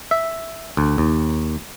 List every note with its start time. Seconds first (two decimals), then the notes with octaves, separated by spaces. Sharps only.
0.11 E5
0.77 D2
0.98 D#2